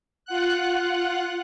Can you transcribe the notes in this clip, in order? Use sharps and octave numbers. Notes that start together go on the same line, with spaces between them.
F4 F#5 F#6